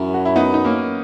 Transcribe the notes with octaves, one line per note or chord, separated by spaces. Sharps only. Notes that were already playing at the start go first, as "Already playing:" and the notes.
Already playing: F#2 C#4 E4
F#4
E4
B3 D#4
D#4
A#3 C#4